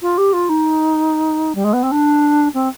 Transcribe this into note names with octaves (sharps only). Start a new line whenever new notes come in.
F4
G4
F4
D#4
G3
G#3
B3
C4
D4
C4